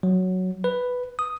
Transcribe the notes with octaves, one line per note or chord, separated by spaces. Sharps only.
F#3
B4
D#6